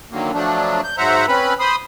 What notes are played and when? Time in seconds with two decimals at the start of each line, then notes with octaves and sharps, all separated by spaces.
0.11 D3 D#3 F#3 A#3
0.33 F3 F#3 A3 D4
0.84 G6
0.97 G#2 F#3 C5 E5 F#5 A#5
1.28 C4 C#4 B4 B5
1.60 C5 B5 C6 D#6